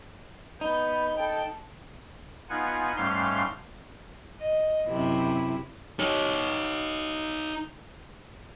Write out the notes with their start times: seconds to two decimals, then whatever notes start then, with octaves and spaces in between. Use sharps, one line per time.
0.61 B3 D#4 B5 G6
1.17 A4 G5
2.50 B3 D#4 F4 F#5 G#5
2.97 G#2 G3 A3 C#4 F5 C6
4.40 D#5
4.88 F#2 C3 E4
5.99 D#4 C#5